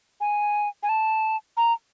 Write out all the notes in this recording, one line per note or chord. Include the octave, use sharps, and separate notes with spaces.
G#5
G#5
A5
A#5